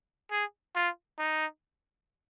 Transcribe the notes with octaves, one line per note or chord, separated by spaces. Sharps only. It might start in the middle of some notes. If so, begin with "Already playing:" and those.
G#4
F4
D#4